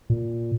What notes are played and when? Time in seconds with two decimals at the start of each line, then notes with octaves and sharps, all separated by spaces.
0.10 A#2